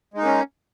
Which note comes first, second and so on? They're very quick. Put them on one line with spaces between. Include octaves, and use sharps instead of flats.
G#3 D#4 A#3 C#4